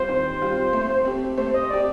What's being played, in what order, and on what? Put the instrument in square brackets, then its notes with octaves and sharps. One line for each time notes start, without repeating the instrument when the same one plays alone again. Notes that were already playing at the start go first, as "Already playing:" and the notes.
Already playing: [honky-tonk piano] G3 C4 F4 [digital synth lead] C5
[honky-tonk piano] D#3
G3 C4 F4
A3
C4 G4
[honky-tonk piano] A3 [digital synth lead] C5
[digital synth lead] D#5
[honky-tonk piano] C4 G4 [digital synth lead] D5